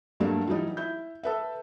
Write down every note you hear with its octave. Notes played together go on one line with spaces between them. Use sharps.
G2 F#3 G3 A3 A#3 D4
E3 F#3 G3 D#4
E4 G6
A4 B4 E5